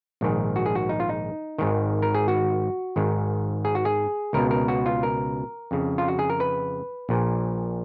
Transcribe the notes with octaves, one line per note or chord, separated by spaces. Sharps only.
A#1 G#2 D#3
F#4
G#4
F#4
D#4
F4
D#4
G#1 G#2 D#3
A#4
G#4
F#4
G#1 G#2 D#3
G#4
F#4
G#4
C#2 B2 A#4
A#4
F#4
F4
A#4
F2 C#3
F4
F#4
G#4
A#4
B4
A#1 A#2